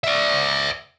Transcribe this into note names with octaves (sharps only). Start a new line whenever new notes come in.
D5 E5